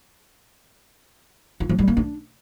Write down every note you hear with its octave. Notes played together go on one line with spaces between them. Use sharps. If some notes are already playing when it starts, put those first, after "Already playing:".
F4
F3
G3
A#3
D4